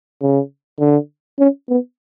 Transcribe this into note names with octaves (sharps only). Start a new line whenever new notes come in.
C#3
D3
C#4
B3